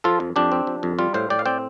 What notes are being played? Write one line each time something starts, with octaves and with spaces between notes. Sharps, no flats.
F3 F4 A4
F2
F2 D4 G4
C4
F3
F2
G3 F4
A2 C5 F5
A2 D5 G5
F5
C4 D5 G5